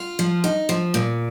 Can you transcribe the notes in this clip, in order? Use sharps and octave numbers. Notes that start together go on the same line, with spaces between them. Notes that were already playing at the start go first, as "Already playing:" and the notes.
Already playing: F4
F3
D#4
F3
A#2